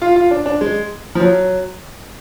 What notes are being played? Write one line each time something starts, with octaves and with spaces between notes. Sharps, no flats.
F4
F4
D4
D4
G#3
F3
F#3